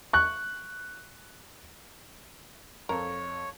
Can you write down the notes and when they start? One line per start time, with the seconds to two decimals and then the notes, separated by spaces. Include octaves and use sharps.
0.13 C#6 F#6
2.89 F2 A4 A#4 C#5